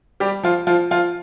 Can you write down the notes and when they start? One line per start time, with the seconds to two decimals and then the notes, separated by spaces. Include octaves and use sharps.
0.20 G3 G4
0.43 F3 F4
0.67 F3 F4
0.91 F3 F4